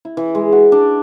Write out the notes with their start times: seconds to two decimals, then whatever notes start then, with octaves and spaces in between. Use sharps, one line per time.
0.05 E4
0.17 E3
0.35 G#3
0.52 F#4
0.72 D4